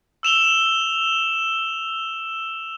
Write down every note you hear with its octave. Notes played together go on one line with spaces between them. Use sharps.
E6 E7 F7 G7